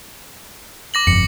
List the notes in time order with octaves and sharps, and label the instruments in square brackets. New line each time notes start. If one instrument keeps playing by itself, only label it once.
[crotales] D6 A#6 F#7
[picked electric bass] G1 F2 [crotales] C#7